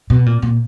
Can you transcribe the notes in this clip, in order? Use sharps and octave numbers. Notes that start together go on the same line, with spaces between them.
B2
A#2
A#2